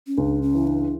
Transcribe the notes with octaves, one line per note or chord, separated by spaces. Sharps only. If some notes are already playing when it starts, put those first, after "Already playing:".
C#4
C#2 D4
C#4
E3
D4